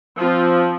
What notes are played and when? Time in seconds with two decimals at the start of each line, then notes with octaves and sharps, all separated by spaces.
0.19 F3 C4 F4